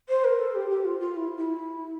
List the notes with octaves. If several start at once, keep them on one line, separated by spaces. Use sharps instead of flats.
C5
A#4
A4
G4
G4
F4
F4
E4
E4